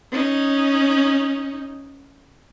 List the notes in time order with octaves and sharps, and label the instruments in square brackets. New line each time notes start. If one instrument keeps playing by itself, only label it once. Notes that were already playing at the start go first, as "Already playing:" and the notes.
[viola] C#4 D#4